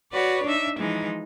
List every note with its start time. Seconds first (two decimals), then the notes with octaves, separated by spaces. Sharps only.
0.12 F#4 B4 C#5 D5
0.44 D4 D#4 E5
0.77 E3 F3 G#3 D#4